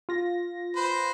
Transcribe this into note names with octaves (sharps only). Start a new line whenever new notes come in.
F4 A#6
B4 C5